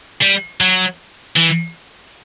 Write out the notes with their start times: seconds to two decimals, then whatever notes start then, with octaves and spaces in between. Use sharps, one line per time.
0.22 G3
0.61 F#3
1.37 E3